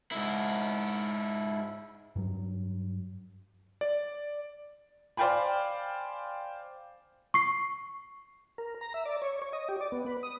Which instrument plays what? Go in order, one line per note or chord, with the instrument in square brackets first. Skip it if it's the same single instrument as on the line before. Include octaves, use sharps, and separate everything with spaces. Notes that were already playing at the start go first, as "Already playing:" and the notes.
[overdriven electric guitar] G#2 E4
[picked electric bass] G2 F#3
[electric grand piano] D5
[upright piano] C5 D5 F5 G5 G#5 B5
[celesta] C#6 C7
[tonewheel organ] A#4
A#5
E5
D5
C#5
C#5
D#5
G4
D5
B3
B4
D#6